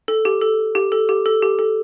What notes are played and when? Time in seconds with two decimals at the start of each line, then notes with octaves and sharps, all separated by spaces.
0.08 A4
0.25 G4
0.41 A4
0.75 G4
0.92 A4
1.09 G4
1.26 A4
1.42 G4
1.59 A4